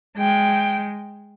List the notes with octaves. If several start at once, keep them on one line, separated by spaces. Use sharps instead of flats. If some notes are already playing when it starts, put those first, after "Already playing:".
G#3 G5